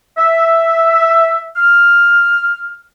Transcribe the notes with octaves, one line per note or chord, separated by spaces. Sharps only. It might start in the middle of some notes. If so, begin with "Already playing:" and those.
E5
F6